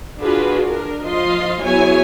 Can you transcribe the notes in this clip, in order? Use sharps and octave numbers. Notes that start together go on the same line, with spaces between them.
D4 F4 F#4 G#4 B4
D4 A#4
F3 F4 D#5 F5 C6
F#3 B3 E4 G#4 C#5 G#5